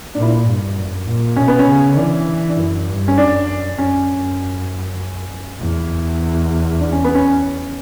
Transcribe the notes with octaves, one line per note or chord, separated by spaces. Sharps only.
A#2 D4
E4
D4
G2
F#2
A#2
B2 C#4
B3
C#4
C#3
E3 D4
D4
F#2 E4
G2
C#4
F#2 D4
F#2 C#4
E2
D4
C#4
B3
C#4